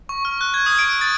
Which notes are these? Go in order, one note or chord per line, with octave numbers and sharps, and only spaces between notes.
C#6
F6
F#6
G#6
D#6
D7
A6